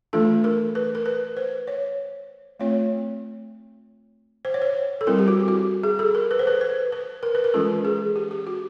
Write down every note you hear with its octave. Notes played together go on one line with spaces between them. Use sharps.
E3 A3 D4 F4 A4
A#4
B4
A#4
B4
C5
C#5
A3 C4 F4 C#5
C5
C#5
C5
A4
G3 C4 E4 A#4
G4
F#4
F#4
G#4
A4
A#4
B4
C5
B4
C5
B4
A#4
B4
A#4
E3 G#3 C#4 F4 A4
G#4
G4
G4
F#4